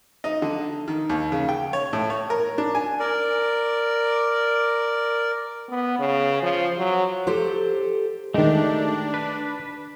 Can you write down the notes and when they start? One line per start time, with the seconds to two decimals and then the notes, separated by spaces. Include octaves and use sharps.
0.24 D#4
0.42 D3
0.88 D#3
1.09 D#2
1.32 C#3
1.49 G5
1.73 C#5
1.93 A2
2.10 C#5
2.30 A#4
2.58 D4
2.75 G#5
2.99 A#4 D5
5.69 B3
5.99 C#3
6.43 F3
6.78 F#3
7.27 G4 A4 C5
8.34 D#3 G#3 A3 D4 D#4 G4
9.14 B4